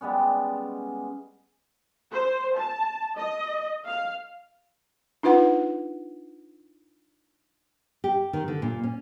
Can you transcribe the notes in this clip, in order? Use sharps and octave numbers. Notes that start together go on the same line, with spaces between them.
G3 G#3 B3 C#4
C5
A5
D#5
F5
D4 D#4 F4 B4 F#5
G4
D#3
D3
A#2
C#4